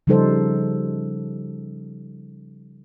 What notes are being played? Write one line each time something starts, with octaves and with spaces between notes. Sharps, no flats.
C#3 F3 G3 D#4 A4 C5